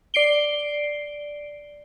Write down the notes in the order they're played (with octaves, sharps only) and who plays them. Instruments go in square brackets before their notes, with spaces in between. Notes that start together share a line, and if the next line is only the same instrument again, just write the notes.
[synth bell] D5 C7 D7 G7